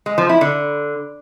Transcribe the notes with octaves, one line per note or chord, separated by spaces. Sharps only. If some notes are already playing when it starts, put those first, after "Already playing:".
G#3
F3
E4
D3